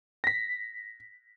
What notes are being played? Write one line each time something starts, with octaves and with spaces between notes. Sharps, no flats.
A#6 B6